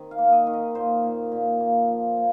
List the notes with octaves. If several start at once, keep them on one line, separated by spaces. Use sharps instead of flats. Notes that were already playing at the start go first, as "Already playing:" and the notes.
Already playing: D#3 C4 D#5
F5
A#3
D#5
D#3
D#5
A#2 C5
A#2
A#2
A#3
F3
A#3